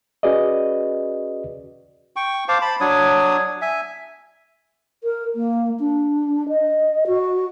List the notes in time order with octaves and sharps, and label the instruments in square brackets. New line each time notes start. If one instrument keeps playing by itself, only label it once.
[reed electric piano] C#4 F#4 G#4 B4 D5 D#5
[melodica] G5 C#6
C5 F5 A5 D6
A5 B5
F#3 D4 C#5 D#6
E5 G#5
[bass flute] A#4
A#3
D4
D#5
F#4